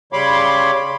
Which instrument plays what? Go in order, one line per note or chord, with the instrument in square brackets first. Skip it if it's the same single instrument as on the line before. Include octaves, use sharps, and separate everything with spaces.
[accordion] C#3 G3 C#5 B5 C6 D6